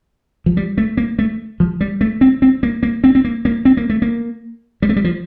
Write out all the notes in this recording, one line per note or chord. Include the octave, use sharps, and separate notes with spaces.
F3
G3
A3
A#3
A3
F3
G3
A3
C4
C4
A#3
A#3
C4
C4
A#3
A#3
C4
A#3
A3
A#3
G3
A3
G3
F3